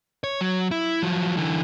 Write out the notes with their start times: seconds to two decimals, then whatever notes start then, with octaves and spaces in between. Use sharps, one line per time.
0.24 C#5
0.41 F#3
0.71 E4
1.02 F3 F#3
1.37 D3 E3